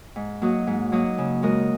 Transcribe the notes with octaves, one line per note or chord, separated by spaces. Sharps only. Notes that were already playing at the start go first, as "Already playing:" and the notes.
G#2
F#3 A#3 F#4 D#5
G#2
F#3 A#3 F#4 D#5
C#3
G#3 F#4 A#4 D#5